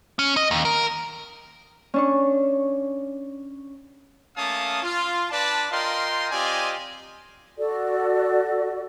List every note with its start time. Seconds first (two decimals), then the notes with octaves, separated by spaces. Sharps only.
0.19 C#4
0.37 D#5
0.51 D#2
0.65 A#4
1.94 C#4 D4 C#6
4.36 A3 A#3 C#4 F5 A5 D#6
4.83 F4
5.31 D4 B4 D5 A5
5.71 F4 A#4 D#5 F5 G5 C6
6.31 C4 F4 G4 D5 D#5 G#5
7.58 F#4 A4 D5